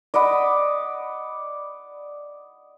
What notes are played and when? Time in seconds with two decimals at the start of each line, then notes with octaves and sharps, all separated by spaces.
0.14 D5 D#5 F#5 B5